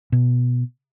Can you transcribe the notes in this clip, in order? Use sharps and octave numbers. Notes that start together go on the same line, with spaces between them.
B2